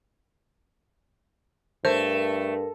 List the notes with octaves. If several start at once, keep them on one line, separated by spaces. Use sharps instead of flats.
G2 A3 A#4 C5